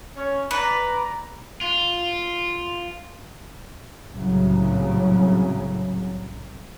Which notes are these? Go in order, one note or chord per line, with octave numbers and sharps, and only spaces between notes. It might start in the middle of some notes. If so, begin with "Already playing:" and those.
C#4 C#5
B4 D5 A#5
F4
C2 A2 C#3 F#3